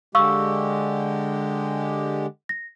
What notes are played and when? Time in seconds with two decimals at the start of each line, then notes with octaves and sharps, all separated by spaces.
0.15 D3 G#3 G4 F5 C#6 E6
2.49 A#6